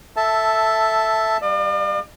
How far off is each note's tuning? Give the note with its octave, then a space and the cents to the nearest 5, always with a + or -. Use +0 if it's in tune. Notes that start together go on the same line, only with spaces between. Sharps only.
A4 +10 E5 +0 A5 +0
G3 +0 D5 +45 F5 +0